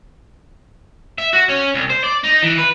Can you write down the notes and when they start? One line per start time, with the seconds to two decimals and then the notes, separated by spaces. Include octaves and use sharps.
1.18 E5
1.33 F#4
1.49 C#4
1.74 C2
1.90 C5
2.04 D5
2.23 D#4
2.42 E3
2.58 B4